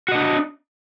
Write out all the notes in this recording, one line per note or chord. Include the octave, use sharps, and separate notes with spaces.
D4 F#4 D#5